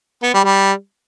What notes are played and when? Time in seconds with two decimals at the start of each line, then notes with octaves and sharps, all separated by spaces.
0.23 B3
0.34 G3
0.44 G3